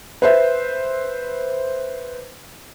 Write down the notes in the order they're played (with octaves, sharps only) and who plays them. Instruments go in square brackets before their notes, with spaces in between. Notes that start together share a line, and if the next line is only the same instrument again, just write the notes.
[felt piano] B4 C5 E5